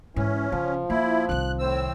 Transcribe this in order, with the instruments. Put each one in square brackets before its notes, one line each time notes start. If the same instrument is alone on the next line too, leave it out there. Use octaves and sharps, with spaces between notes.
[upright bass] G#2 [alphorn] E3 [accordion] C#4
[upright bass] C#3 [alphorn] F3
[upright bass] A#3 [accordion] E4
[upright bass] C2 D#3 [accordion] F#6
[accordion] A2 C4 E6